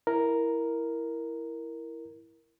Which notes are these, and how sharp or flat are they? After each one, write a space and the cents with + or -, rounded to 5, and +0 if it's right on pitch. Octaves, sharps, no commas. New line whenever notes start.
E4 +0 A#4 +0